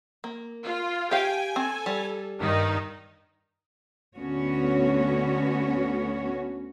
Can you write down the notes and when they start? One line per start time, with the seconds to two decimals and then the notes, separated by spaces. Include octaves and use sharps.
0.24 A#3
0.64 F4
1.11 G4 F5 G5 G#5
1.56 C4 A4
1.86 G3
2.39 G2 D#3 D#4
4.18 D2 D3 B3 C#4 F#4 C#5